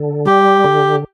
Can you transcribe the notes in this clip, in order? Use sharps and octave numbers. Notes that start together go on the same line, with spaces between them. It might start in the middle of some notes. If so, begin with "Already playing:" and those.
Already playing: D3
G3 G4
D3